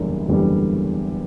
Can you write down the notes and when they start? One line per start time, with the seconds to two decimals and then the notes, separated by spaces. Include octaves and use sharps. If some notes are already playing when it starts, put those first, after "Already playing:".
Already playing: F#1 E2 D3 G3
0.28 F#1 E2 D3 G3